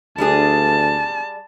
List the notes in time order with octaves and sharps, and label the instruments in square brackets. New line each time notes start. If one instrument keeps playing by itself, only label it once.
[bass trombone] D2 [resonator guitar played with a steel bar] G3 D4 G#4 [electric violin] A5